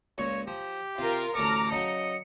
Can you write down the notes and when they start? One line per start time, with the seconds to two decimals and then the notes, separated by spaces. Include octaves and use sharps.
0.18 C#2 A#2 C#5 C#6
0.47 F3 G4
0.98 C3 F4 A#4
1.35 A1 D2 A4 A#5 C#6 D6 F6
1.72 C#3 F#3 D#4 D#5 C#7